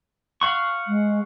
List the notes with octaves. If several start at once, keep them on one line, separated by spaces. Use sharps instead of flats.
F5 F#5 C#6
G#3